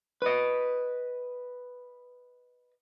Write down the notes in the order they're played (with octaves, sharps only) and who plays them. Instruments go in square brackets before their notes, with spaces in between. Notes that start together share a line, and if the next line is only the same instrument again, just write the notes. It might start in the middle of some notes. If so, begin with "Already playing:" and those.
[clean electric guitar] B4 D#5